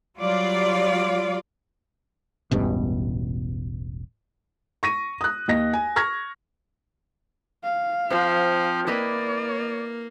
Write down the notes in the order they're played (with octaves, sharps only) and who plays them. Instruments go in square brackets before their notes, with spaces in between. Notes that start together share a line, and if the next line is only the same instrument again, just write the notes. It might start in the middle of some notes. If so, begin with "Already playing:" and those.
[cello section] F#3 G3 F4 D5
[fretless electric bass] E1 A1 G2 B2
[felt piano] C#6 A#6 D#7
D#6 F#6
D#2 D#5 A#6
G#5
C#6 F6 G#6 A#6
[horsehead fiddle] F5
[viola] F3 [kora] C4
[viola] A#3 [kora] E4 B4 D#5 [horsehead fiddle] D5